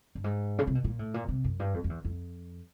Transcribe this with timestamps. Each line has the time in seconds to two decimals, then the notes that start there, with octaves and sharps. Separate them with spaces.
0.15 G2
0.24 G#2
0.59 C#3
0.67 C3
0.75 B2
0.84 A#2
0.99 A2
1.14 A#2
1.29 C3
1.44 F#2
1.60 G2
1.74 F2
1.84 F2
1.90 E2
2.05 F2